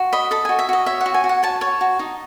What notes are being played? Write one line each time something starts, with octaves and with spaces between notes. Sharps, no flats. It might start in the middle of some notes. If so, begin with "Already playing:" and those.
Already playing: F#4
D#5 B5
A4 B5
F#4 G#5
E5
F#4 D#5
C#5 E5
F#5
F#4
G#5
F#4
F#5
C#5 A5
C#5
F#4
D#4